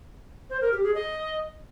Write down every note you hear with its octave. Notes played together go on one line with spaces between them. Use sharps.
C5
A#4
G4
G#4
D#5